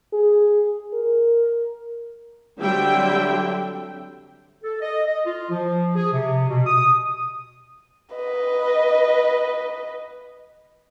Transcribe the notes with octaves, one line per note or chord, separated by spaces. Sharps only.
G#4
A#4
D3 F#3 G3 C4 E5 G5
A4
D#5
D#5
F4
F3
G#4
C3
B2
D#6
B4 D#5